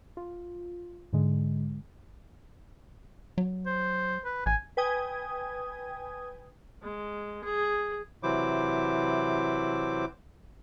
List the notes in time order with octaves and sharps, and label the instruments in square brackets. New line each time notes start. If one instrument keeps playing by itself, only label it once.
[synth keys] F4
G#2 D3 G#3
[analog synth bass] F#3
[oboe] C5
B4
[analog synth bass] A1 [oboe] G#5
[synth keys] B4 G5 G#5 D#6 G#6
[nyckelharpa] G#3
G#4
[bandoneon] C3 E3 F#3 E4 C5 D6